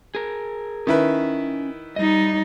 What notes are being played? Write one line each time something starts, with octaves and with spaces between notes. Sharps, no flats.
G#4 A#4
D#3 C#4 E4 B4
G3 D#4 D#5